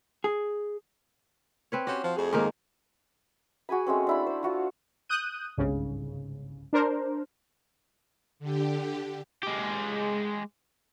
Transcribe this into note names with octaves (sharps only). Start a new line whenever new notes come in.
G#4
C4 B4 C#5
C#4 F#4 G4 C5
F3
F2 A3 G#4
G#2 D#3 A#3
F#4 G#4 G#5 B5
G#3 A3 C4 C#4
D4 E4 B5
C5
F4 F#4 F5
D#6 F#6 G6 D#7
G1 C2 G#2 C#3
D4 A#4 C5
D3 G4
G#3 G4